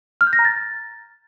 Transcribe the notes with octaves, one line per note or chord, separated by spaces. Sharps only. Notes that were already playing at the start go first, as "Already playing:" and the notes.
F6
G6
A#6
A#5
A6